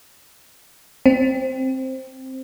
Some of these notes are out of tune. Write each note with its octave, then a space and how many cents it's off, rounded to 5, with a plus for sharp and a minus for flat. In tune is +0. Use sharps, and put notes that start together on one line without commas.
C4 +5